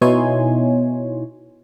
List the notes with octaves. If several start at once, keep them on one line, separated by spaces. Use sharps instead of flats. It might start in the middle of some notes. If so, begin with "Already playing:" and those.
B2 D#4 E4 C#5 G#5 C6